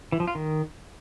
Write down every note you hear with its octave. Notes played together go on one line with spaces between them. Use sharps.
E3
F3
F4
D#3